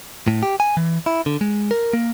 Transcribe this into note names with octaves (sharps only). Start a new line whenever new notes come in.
A2
G4
G#5
E3
E4
D3
G#3
A#4
A#3